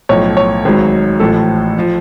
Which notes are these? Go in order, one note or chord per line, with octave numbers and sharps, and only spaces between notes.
B1 A2 F3 C#5
C#5
G#1 G#2 F#3
A1 A2 F3 A4
F3